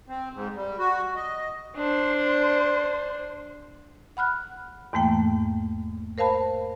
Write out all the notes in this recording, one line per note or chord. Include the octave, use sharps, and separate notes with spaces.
C4
G#2
G3
F#4
D#5
D4 C5
F#5 B5 F6 F#6
E2 G#2 E3 A3 A#3 G5
A#4 C5 F5 A5 B5